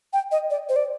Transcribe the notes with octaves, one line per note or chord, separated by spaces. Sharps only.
G5
D#5
D5
C5
D5